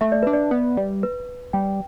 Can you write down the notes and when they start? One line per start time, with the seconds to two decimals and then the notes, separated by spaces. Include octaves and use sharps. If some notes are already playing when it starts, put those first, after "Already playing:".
0.01 A3 E5
0.12 D5
0.23 D4 B4
0.33 D5
0.51 B3
0.77 G3
1.03 B4
1.53 G3 G5